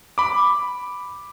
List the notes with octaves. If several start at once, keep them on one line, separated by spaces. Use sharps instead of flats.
B5 D6